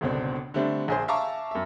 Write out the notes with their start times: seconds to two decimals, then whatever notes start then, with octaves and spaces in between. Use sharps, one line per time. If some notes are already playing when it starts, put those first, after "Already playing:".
0.01 G1 C#2 B2 D3 C4 D4
0.54 D3 G3 A3 C4 D4
0.88 A#1 G#4 C5
1.08 E5 F5 A5 A#5 C#6 D6
1.51 F#2 E5